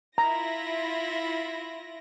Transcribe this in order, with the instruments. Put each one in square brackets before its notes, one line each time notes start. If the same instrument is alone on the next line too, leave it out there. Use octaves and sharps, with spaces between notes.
[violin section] E4 F4 A#6 [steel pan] A#5